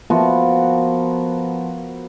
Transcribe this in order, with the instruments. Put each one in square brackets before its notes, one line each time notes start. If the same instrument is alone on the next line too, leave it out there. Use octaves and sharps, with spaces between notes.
[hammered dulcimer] F3 B3 F#4 A#4